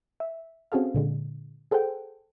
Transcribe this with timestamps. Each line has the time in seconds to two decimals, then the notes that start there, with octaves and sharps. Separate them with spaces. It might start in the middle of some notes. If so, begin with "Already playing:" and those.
0.20 E5
0.72 C4 C#4 F#4 G#4 A4 F5
0.94 A#2 D3 G#3
1.71 G#4 A4 C5 F#5 G5